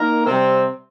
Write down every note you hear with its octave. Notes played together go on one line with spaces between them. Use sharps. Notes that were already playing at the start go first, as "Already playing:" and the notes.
Already playing: A#3 D#4 A#4
C3 G3 C4